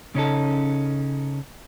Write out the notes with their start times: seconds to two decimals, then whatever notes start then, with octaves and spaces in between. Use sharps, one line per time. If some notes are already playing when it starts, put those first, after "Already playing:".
0.15 C#3 C#4 D#4 A4